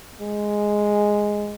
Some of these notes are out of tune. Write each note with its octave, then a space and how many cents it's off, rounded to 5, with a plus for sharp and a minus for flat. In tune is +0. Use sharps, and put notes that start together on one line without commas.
G#3 +0